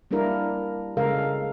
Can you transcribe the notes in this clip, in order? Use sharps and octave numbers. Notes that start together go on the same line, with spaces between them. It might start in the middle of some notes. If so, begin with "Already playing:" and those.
G3 A#3 D4 E4 A#4
C#3 G#3 A4 A#4 F5